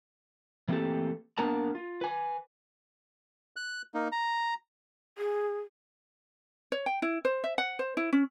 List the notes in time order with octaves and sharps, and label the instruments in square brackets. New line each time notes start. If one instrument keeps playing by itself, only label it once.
[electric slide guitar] E3 A3 A#3 C4 G4 A4
A#3 B3 D4 A#4 A5 A#5
F4
B4 G#5
[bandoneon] F#6
A#3 D#4
A#5
[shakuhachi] G#4
[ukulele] C#5
G5
E4
C5
E5
F#5
C5
E4
C#4